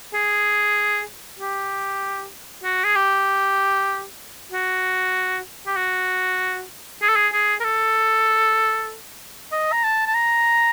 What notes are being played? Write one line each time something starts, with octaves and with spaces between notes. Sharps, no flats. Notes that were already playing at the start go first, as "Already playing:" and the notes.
G#4
G4
F#4
G#4
G4
F#4
G4
F#4
G#4
A4
G#4
G#4
A#4
A4
D#5
A#5
A5
A5
A#5